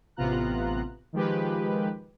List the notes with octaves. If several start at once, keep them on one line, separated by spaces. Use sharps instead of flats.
A1 C3 B3 F4 A#5 F#6
D#3 F3 G#3 G4 B4